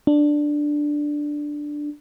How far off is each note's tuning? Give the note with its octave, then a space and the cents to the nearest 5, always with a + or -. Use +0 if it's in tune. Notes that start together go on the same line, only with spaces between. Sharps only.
D4 +5